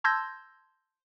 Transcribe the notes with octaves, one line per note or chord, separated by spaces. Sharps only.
A5 C6 E6 G6 G#6 A#6